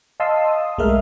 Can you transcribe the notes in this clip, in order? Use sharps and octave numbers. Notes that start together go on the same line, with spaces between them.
D#5 F5 A5 C6 D#6 E6
D#6
B1 G#3 A3 A#4 E5 F6